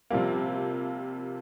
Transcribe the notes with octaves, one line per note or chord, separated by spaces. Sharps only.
C3 F3 G3 A#3